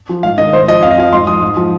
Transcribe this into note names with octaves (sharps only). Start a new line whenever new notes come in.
F3
G#2 F5
D#3 D#5
G#2 C5
F3 D#5
F2 F5
D#5
F3 F5
G#2 C6
F3 D#6
G#2
F3